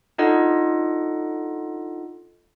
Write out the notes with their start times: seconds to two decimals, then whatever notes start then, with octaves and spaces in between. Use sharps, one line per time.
0.18 D4 D#4 F4 A4 D#5 F#5